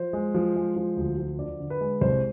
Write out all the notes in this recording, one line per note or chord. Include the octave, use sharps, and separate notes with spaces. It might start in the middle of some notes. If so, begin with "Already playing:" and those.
Already playing: F3 C5
G#3
F3
G#3
F3
D2
F3
D3 D5
D3
B4
G#3
C2 C5